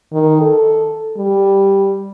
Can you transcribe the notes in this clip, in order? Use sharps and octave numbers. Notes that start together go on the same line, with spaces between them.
D#3
A4
G3